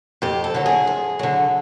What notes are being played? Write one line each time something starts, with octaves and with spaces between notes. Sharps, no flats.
F2 G4
A4
D3 F#3
G#4
F2
D3 F#3